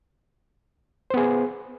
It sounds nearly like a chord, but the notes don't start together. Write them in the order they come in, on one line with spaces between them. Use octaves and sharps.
C5 B3 G#4